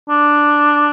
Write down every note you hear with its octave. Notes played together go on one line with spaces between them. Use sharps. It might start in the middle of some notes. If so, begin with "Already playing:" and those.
D4